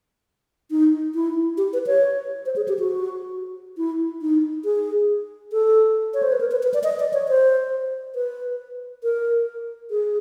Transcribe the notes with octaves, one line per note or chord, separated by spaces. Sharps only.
D#4
E4
G4
B4
C#5
C5
G#4
G4
F#4
E4
D#4
G#4
A4
C#5
C5
B4
A#4
B4
B4
D5
D#5
D5
C#5
C5
B4
A#4
G#4